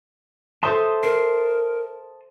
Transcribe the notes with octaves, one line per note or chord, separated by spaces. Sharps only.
A4 C5 E5 A5 C6 D#6
A#4 C7